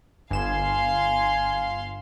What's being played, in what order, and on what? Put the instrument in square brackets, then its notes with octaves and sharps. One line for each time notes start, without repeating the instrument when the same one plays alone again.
[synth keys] G1 E7 [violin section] F5 C6 [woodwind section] G#5